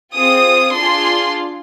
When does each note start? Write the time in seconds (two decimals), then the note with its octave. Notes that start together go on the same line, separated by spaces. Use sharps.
0.14 C4 F4 G#4 D#6
0.76 D4 F4 G#4 C6